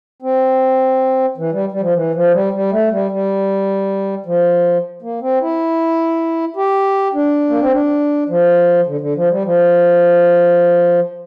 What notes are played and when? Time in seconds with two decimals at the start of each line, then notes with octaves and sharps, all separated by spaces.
0.22 C4
1.38 E3
1.52 G3
1.72 G3
1.81 F3
1.95 E3
2.15 F3
2.33 G3
2.53 G3
2.72 A3
2.91 G3
3.11 G3
4.26 F3
5.02 A#3
5.22 C4
5.41 E4
6.56 G4
7.14 D4
7.49 A#3
7.61 C4
7.72 D4
8.29 F3
8.87 D3
9.01 D3
9.16 F3
9.30 G3
9.45 F3